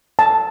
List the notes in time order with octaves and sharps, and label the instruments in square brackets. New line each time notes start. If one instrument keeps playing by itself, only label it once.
[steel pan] A5